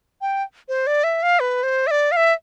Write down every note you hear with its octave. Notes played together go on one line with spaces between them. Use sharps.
G5
C5
D5
E5
F5
B4
C5
E5
D5
F5
E5